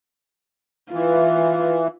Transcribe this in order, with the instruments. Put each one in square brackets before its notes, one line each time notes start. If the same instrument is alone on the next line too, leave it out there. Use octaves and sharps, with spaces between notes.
[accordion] E3 [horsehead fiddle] F4